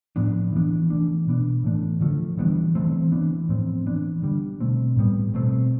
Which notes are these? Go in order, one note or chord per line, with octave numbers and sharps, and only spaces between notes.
A2 F3 B3 D4
E3 B3 D4
E3 A3 D4
B2 B3 D4
A2 E3 A3 D4
D3 F3 A3
E3 G3 B3 D4
E3 A3 C4
E3 B3 D4
A2 F3 C4
E3 B3 D4
D3 G3 D4
B2 A3 C4
A2 G3 B3
B2 A3 C4